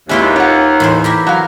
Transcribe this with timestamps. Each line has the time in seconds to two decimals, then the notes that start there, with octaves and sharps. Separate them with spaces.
0.09 D#2 G#3 C#4 E4 F4 B4 G5
0.36 F4 F#5
0.80 A2 E3 C5
1.04 E4 G4 A#4
1.27 F#3 F5